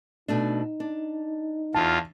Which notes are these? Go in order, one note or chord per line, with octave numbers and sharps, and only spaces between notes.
B2 A3 D4 D#4
D4
E2 F4 A5